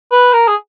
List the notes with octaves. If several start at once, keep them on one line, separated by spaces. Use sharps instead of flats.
B4
A#4
G#4